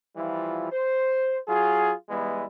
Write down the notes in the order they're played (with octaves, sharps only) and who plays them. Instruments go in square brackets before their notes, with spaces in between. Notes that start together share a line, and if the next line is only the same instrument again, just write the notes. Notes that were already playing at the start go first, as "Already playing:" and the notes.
[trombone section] E3 F3 G3 E4 F4
C5
F#3 F4 G#4
E3 G3 G#3 B3 E4